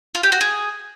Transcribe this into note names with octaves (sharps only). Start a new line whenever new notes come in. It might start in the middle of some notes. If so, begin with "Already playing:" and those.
F4
G4
F#4
G#4